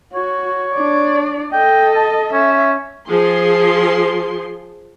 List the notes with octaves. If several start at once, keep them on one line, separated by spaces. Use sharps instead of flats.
F#4 C#5
D4 D5
A4 D#5 G5
A5
C#4 E5
F3 G#4 C6